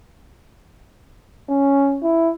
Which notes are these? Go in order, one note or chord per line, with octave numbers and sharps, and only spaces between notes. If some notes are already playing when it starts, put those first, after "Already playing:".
C#4
E4